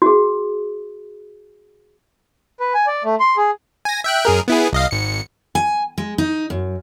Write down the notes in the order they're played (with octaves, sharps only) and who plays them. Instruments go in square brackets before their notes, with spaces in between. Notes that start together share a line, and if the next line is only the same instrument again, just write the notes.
[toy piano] F#4 G#4
[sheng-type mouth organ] B4
G#5
D5
A3
C6
G#4
[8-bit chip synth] G#5 A#6
E5 G5 F#6
F#2 G#4 A#4
B3 E4 G#4
C2 D#5 F5
G#1 C#7
[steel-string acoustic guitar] G#5
G#3
D#4
F#2